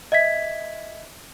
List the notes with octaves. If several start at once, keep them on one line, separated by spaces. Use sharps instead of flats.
D#5 E5 G#6 B6